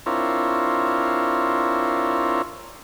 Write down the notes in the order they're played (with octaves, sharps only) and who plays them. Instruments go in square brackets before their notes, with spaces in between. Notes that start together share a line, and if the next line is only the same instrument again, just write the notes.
[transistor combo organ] C4 D4 E4 F4 A#4 C#5